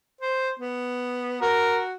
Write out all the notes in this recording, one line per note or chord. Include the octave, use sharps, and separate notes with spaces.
C5
B3
F#4 A#4